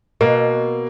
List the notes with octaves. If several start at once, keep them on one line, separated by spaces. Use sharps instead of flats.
B2 A#3